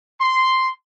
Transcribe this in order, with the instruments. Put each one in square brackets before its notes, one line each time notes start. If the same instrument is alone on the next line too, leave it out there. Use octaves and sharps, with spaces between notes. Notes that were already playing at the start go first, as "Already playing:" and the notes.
[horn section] C6